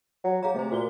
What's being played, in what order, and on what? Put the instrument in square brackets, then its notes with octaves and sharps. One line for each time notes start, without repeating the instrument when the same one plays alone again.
[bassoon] F#3
[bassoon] F#3 [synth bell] G#4 F5 A#5
[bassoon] C3 [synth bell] A3 C5
[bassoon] A#2 [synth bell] F#4 G7